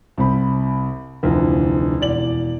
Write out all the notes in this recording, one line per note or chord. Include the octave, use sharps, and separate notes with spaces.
C2 C4 B5
F1 D2 E3 F3 A#4
E1 E3 D5 F#7